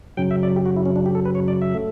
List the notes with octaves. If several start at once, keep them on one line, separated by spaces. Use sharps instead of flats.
F#2 C#3 F#3 G5
E5
D5
G4
F#4
E4
C#4
D4
G4
A4
B4
C#5
D5
E5
A3